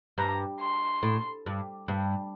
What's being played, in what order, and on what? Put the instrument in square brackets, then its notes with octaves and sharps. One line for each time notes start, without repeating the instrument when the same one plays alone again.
[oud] G2 [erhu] A#5
[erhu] C6
[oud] A2
G2
G2